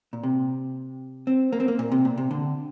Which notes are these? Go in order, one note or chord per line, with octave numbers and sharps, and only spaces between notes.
A#2
C3
C4
A#3
C4
A#3
A#2
C3
A#2
C3
D3